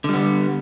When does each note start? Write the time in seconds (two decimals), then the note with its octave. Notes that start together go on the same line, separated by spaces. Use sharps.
0.04 D3
0.09 G3
0.14 B3